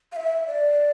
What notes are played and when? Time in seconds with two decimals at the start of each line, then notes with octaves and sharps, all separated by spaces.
0.12 F5
0.16 E5
0.47 D5